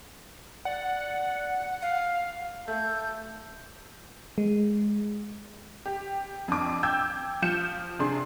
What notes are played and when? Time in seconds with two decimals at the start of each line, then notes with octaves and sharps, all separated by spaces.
0.65 D5 F#5
1.82 F5
2.68 A3 A4 G6
4.38 G#3
5.86 G4
6.48 F2 D4 D6
6.83 G5 E6 G6 G#6
7.42 F3 G6 C#7 E7
7.99 C3 D4 G#4 C6